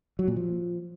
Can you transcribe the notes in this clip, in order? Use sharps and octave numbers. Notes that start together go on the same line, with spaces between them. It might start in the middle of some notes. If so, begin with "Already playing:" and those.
F#3
A#2
F3